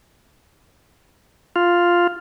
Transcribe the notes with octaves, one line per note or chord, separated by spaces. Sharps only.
F4